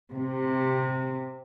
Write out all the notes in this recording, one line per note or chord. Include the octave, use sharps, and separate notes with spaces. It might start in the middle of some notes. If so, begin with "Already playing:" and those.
C3